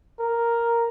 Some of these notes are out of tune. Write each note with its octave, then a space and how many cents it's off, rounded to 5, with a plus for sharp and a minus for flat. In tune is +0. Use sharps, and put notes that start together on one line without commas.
A#4 +0